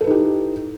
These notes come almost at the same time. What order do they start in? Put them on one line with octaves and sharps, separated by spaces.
A4 B4 D#4 G4 E4